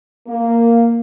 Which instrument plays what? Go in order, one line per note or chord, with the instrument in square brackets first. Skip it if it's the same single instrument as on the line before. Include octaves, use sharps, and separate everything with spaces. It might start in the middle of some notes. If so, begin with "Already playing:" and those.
[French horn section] A#3